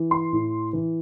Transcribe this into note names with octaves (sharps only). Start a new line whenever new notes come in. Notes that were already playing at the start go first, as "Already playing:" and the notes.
Already playing: E3
C6
A2
E3